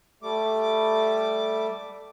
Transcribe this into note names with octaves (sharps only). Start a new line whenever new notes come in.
G3 A3 D6